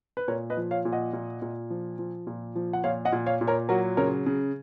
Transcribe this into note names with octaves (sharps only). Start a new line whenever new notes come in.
B4
A#2 A#4 C#5
B4 D#5
F3
C#5 F5
A#2
D#5 F#5
A#2
A#2
F3
F3
A#2
F3
F#5
A#2 C#5 F5
D#5 F#5
A#2
C#5 F5
A#2
A#4 C#5
F#3 F#4 A#4
C#3 A#4 C#5
C#3